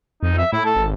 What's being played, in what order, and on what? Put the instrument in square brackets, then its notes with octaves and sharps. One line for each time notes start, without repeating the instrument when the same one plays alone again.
[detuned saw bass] F2 [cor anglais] D#4
[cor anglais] E5
[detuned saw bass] A2 [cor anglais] E4
[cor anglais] A4
[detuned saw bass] G#1